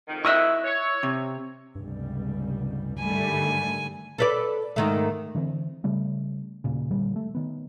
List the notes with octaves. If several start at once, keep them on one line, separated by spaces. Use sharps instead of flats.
F2 G#2 D#3
E4 D#5 E5 C#6 E6 F#6
C#5
C3
F1 C#2 G2 G3
G#2 D3 D#3 G3 A3 G#5
A4 B4 D5
G#2 D#3 A3
D3 E3 G#3 C4
C#3 G3 A3
D#1 D#2 A#2 C#3
A#2 D3 D#3 G3
A3
D#3 B3